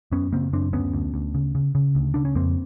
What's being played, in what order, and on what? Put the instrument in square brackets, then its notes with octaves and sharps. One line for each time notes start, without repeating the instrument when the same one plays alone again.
[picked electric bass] F#2 B3 C#4
C#3 A#3 C4
F#2 C4 D4
D2 B3 C#4
D2
D2
C#3
C#3
C#3
D2
C#3 D4
C#4
F2 A#3 C4